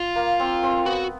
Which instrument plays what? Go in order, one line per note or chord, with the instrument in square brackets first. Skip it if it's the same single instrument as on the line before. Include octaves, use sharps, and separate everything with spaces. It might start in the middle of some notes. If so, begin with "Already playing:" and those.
Already playing: [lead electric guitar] F4
[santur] A#3
C4
C4
[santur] B3 [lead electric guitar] F#4